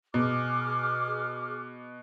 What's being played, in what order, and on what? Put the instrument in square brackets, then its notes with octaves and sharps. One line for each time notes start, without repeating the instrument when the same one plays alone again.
[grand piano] B2 [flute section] G#4 D6 F6